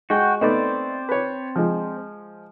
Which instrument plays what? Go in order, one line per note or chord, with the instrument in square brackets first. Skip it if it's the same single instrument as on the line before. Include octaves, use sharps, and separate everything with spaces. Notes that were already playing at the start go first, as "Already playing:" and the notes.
[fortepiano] G#3 [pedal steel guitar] F#4 G5
[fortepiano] A3 B3 D#4 [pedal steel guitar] C4 C5 D5
[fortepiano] B4 C#5
F3 G#3